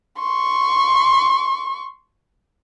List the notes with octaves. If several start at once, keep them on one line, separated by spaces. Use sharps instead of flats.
C6 C#6